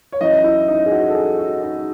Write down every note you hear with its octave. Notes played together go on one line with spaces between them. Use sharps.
C#5
F#2 E3 D#5
E4
D#4
G#4
F#4
A4
G#4
F#4
D#4